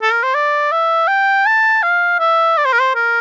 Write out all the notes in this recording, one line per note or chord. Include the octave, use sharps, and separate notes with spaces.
A4
A#4
C5
D5
E5
G5
A5
F5
E5
D5
C5
A#4
C5
A#4